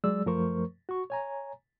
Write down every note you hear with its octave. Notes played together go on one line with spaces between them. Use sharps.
F#3 G#3 G#4 D5 E6
F#2 F3 A3 A#4 C5 C#6
F#4 C#6
C#5 G#5 A#5